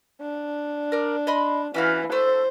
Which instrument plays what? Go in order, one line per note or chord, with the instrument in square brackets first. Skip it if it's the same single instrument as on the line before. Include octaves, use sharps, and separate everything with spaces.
[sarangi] D4
[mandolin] A#4 D5
D#5 B5 C6
[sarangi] E3 [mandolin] C#4 F#4 F5
[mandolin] A3 A5 E6 [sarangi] C5